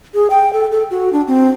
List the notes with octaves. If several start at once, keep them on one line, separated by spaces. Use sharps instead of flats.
G#4
G5
A4
A4
F#4
D4
C4